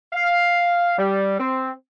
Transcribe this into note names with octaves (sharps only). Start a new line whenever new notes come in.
F5
G3
C4